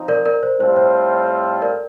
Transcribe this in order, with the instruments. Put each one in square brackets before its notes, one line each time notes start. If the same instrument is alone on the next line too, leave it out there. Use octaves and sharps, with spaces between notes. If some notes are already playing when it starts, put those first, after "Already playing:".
Already playing: [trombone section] F3 C4 D#4
[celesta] A#4 D5
A#4 D5
C5
[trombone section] A2 G3 C4 F4 A4 [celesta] C5
[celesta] C5
A#4 D5